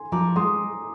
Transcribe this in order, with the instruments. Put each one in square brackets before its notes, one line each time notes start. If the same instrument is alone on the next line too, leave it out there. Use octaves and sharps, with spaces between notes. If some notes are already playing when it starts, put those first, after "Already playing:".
Already playing: [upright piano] G#5 C6
[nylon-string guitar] F3 [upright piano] A#5 D6
[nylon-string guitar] G#3 [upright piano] C6 D#6